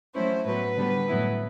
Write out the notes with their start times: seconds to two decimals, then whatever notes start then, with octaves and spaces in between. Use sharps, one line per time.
0.15 F#3 A3 C#4 E4 C5
0.45 A2 F#3 B3 B4
0.76 D3 G3 B3
1.08 A2 F#3 B3 E4